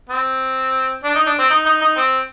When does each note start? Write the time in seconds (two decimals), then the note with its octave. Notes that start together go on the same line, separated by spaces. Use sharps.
0.09 C4
1.04 D4
1.15 D#4
1.26 D4
1.39 C4
1.50 D#4
1.66 D#4
1.81 D#4
1.97 C4